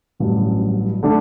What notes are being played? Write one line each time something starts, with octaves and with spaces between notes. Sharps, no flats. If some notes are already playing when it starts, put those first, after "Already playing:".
A1 G2 F#3
D3 A3 D4